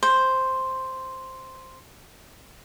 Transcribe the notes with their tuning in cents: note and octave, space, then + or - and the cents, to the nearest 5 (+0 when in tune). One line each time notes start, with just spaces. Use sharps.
C5 +0